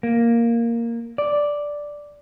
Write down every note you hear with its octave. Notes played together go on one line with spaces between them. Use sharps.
A#3
D5